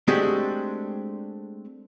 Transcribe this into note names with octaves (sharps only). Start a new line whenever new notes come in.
G#3 A3 C4 D4 F#4 G4